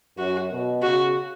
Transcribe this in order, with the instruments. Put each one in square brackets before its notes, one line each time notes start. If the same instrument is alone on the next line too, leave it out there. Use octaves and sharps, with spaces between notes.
[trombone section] F#2 [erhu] F#4
[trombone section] B2
[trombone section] C#3 [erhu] F#4